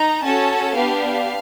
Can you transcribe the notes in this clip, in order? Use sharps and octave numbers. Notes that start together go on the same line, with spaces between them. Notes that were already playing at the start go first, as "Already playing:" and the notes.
Already playing: D#4 A#5
C#4 F#4 A4 A5
B3 D4 G4 F5